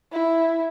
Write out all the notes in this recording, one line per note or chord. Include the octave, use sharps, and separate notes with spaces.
E4